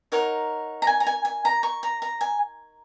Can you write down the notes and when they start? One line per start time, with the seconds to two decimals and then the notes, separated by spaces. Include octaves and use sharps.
0.12 D#4 A#4 C#5 F#5
0.82 A#5
0.87 G#5
1.00 A#5
1.06 G#5
1.25 G#5
1.45 A#5
1.63 C#6
1.83 A#5
2.02 A#5
2.21 G#5